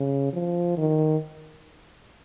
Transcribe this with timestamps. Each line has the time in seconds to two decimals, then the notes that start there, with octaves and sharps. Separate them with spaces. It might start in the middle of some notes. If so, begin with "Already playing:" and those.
Already playing: C#3
0.33 F3
0.77 D#3